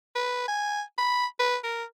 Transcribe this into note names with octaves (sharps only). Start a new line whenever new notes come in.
B4
G#5
B5
B4
A#4